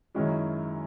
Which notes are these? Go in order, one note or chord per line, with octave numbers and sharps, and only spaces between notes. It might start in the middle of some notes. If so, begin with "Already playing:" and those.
F#2 D#3 G#3 C#4 E4